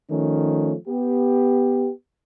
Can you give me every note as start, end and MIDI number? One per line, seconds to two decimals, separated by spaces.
0.11 0.75 51
0.11 0.75 53
0.11 0.75 57
0.11 0.75 61
0.88 1.91 59
0.88 1.91 67